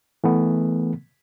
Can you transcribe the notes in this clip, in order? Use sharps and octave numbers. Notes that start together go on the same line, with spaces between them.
E3 A3 B3